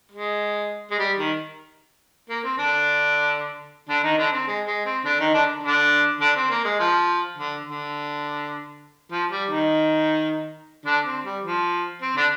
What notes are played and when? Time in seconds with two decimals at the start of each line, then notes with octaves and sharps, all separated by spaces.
0.11 G#3
0.90 G#3
0.98 G3
1.18 D#3
2.29 A#3
2.43 C4
2.58 D3 D4
3.89 D3 D4
4.03 D#3 D#4
4.17 D3 D4
4.32 C4
4.47 G#3
4.66 G#3
4.85 C4
5.05 D3 D4
5.19 D#3 D#4
5.34 D3 D4
5.63 D3 D4
6.20 D3 D4
6.36 C4
6.50 A#3
6.64 G#3
6.79 F3
7.37 D3
7.66 D3
9.11 F3
9.31 G3
9.50 D#3 D#4
10.85 D3 D4
11.05 C4
11.24 G3
11.43 F3
12.02 C4
12.16 D3 D4